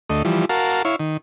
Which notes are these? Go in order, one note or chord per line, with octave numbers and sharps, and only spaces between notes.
D2 A3 D#5
E3 F3 G3
F#4 A#4 F5 A5
E4 C#5 F5
D#3